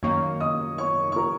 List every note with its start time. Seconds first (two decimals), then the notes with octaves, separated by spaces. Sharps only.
0.03 F#2 D#3 A#3 C#5 C#6
0.40 D#5 D#6
0.78 C#5 C#6
1.12 C#6
1.16 A#4 A#5